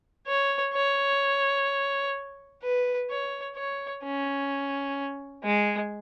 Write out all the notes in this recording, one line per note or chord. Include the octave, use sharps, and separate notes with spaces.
C#5
C#5
B4
C#5
C#5
C#4
G#3